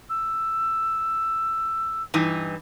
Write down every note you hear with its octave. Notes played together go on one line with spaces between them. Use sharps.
E6
G2 E3 D#4